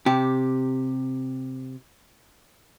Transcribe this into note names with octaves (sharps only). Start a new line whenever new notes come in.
C3 G4